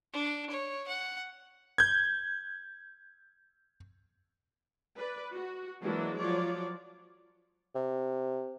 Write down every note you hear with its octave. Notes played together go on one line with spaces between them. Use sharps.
D4
C#5
F#5
G6 G#6
B4 D5
F#4
E3 F#3 G#3 A#3 D4 E4
F3 F#3 F4 C#5 D5
C3